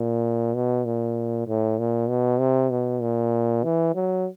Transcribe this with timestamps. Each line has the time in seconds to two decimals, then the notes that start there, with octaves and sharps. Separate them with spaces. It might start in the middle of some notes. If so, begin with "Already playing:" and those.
Already playing: A#2
0.54 B2
0.85 A#2
1.47 A2
1.79 A#2
2.09 B2
2.40 C3
2.70 B2
3.02 A#2
3.64 E3
3.95 F#3